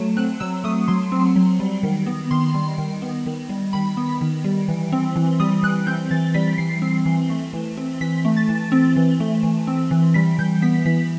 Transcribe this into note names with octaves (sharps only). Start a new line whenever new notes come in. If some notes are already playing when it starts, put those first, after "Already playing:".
Already playing: F#3 A3
C4 F#6
F#3 E6
A3 D#6
F#3 C6
C4
F#3
G3
D#3
B3
D#3 C6
G3
D#3
B3
D#3
G3
D#3 B5
B3
D#3
G3
E3
C4
E3
G3 D#6
E3 F#6
C4 G6
E3 A6
G3 B6
E3 C7
C4
E3
A3
E3
C4
E3 B6
A3
A6
E3
C4
E3
A3
E3
C4
E3
G3 B6
E3 G6
B3 B6
E3 B6